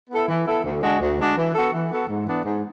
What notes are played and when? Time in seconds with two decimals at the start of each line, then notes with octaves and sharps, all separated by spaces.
0.10 B3 E4 A4
0.27 E3
0.45 B3 E4 A4
0.64 D2
0.82 D3 G#3 D4 F#4
1.00 D2
1.17 D3 G#3 D4 F#4
1.36 E3
1.54 B3 F#4 A4
1.72 E3
1.90 B3 F#4 A4
2.07 G#2
2.26 E3 B3 D4
2.44 G#2